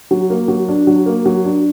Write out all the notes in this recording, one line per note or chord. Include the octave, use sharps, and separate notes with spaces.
F#3
A#3
F#3
D4
F#3
A#3
F#3
D4